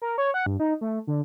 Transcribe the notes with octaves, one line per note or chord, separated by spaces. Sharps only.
A#4
C#5
F#5
G2
D#4
A3
D3